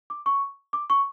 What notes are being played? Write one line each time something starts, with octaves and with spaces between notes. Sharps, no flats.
D6
C#6
D6
C#6